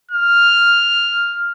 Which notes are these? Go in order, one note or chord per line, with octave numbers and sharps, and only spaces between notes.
F6